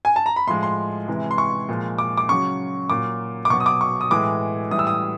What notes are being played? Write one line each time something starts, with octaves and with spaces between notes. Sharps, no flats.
G#5
A5
A#5
B5
A2 F3 G#3 C6
C6
C3 E3 G#3
C6
C#6
A#2 F3 G#3
D6
D6
C#3 F#3 C#6
A#2 F#3 D6
D6
B2 F#3 C#6
D#6
D6
C#6
D#6
A2 E3 G#3 D6
A2 E3 G3 D#6
E6
D#6